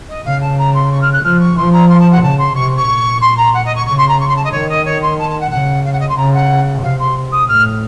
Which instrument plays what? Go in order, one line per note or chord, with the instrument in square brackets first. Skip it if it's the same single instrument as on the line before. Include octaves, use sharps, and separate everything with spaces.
[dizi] D#5
[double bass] C#3 [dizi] F5
[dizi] A5
A#5
C6
C#6
F6
F#6
[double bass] F3 [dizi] F6
[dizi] C#6
[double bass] F3 [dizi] C6
[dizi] A#5
C6
A5
F#5
[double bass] C#3 [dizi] A5
[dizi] C6
[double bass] C3 [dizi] C#6
[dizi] C#6
[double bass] A#2
[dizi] C6
A#5
F#5
D#5
C#6
[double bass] C#3 [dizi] C#6
[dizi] C6
A#5
C#6
C6
A5
D#5
[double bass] D#3 [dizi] C#5
[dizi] D#5
C#5
C6
A5
A5
F#5
[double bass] C#3 [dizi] F#5
[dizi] F5
F#5
D#5
C6
[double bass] C#3 [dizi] A#5
[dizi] F#5
[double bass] C3 [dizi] F5
[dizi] C6
D#6
[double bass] A2 [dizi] F6